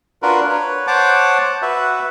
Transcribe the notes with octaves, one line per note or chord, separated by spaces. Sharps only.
D4 F4 F#4 A#4 B4
B4 C#5
C5 C#5 F#5 A5 D6
F#4 B4 E5